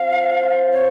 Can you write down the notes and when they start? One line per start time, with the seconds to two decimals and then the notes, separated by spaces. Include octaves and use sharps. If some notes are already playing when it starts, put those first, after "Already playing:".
Already playing: C4 F4 C5 F5
0.11 F3
0.42 C4 F4 C5
0.73 C3 C#5